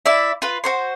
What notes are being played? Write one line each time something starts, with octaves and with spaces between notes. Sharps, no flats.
E4 D5 E5
F4 B4
F#4 C5 C6